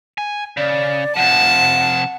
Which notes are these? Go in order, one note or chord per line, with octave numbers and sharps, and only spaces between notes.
G#5
C#3 D5
C3 F3 F#5 A5